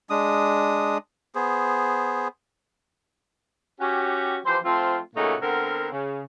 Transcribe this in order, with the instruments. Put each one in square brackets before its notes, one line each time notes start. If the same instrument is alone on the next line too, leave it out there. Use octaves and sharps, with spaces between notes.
[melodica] G#3 D4 D#6
B3 G#4 C5
[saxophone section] C#4 F#4 G4
E3 F3 G4 C5
F3 A3 C4 F4
A#2 C#3 A3 A#3 D#4 F#4
D3 B3 C4 A#4
C#3